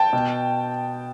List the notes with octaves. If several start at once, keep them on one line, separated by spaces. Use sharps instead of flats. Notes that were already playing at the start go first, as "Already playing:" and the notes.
Already playing: G5 A5
B2